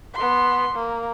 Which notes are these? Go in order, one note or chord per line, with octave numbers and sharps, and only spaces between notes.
B3 C6
A#3